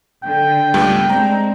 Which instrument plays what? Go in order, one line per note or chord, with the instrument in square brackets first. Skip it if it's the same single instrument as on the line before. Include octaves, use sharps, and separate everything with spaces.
[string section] D3 [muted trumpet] G5
[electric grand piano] C#2 G2 G3 [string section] A3 B3
[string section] G#3 C4 D4 [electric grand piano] A#5